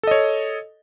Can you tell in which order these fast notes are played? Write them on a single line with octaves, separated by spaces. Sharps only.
A4 D#5 C#5